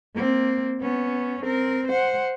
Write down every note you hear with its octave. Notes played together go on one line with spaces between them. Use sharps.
A#3 C4
B3 C#4
C4 A#4
C5 F#5